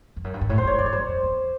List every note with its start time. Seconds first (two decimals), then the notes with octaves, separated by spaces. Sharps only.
0.16 F2
0.24 F#2
0.34 G2
0.41 G#2
0.49 A2 C#5
0.58 C5
0.65 G#2 C#5
0.78 G2 D5
0.86 C#5
0.93 F#2 C5
1.08 F2
1.23 E2